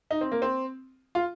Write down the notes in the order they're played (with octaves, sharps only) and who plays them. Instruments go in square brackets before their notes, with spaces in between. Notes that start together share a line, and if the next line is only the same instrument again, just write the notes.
[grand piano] D#4
C4
A#3
C4
F4